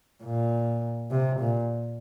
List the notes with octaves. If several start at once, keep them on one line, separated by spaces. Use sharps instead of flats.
A#2
C3
A#2